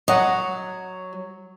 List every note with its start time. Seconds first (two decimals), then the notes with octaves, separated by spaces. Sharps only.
0.08 F#3 D#5 F#5